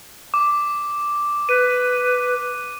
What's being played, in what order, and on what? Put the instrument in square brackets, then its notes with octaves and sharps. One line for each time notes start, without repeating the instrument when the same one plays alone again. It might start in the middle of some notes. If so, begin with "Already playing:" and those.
[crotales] D6
[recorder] B4 [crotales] D#7